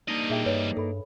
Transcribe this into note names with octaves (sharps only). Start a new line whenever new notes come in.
G3 A#3 D4 D#4 D#5
A#2 G#4 E5 G5
G2 B4 C#5
G2 A4 B5